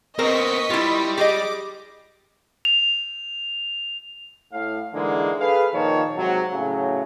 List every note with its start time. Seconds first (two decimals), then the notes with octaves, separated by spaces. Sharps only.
0.19 B3 C4 A#4 D#5 C#6 B6
0.70 G3 E4 F4
1.18 G4 G#4 D#5 D6
2.65 F7
4.52 A2 F5
4.94 G#2 D3 E3 G#3 A#3
5.39 G#4 A4 B4 F5
5.73 A#2 D#3 F3 C#5 A5
6.16 G#2 C3 F#3
6.52 A2 C#3 F#3